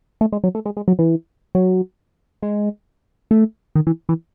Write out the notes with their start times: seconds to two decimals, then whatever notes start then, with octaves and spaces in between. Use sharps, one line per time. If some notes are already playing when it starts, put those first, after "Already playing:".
0.21 A3
0.32 G#3
0.44 F#3
0.55 A3
0.66 G#3
0.77 G#3
0.88 F#3
0.99 E3
1.55 F#3
2.43 G#3
3.31 A3
3.75 D#3
3.87 E3
4.09 E3